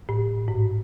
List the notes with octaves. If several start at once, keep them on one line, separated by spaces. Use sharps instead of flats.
A2
G#2